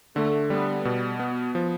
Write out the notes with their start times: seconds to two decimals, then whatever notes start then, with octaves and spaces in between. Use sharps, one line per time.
0.16 D3 A3
0.50 G3 B3
0.85 B2
1.19 B3
1.55 F3